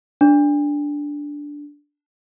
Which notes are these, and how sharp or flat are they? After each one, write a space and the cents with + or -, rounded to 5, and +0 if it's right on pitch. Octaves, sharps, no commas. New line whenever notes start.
D4 -5